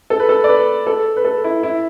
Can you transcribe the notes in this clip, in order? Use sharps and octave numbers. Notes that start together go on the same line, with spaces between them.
A4
B4
A4
D5
B4
A4
B4
A4
E4
E4